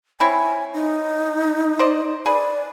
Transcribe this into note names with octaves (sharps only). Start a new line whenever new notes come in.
C4 E4 C#5 G#5
D#4
C5 D5 D#5
G#4 B4 D5